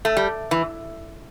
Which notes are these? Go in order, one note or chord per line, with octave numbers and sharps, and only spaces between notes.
A3
G3
E3